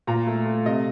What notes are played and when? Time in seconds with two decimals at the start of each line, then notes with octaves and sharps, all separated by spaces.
0.07 A#2 A#5
0.27 A3
0.46 A3
0.65 C3 D#5